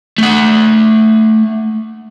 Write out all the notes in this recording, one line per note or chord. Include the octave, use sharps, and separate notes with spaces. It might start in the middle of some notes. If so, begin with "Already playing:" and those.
A3 F#5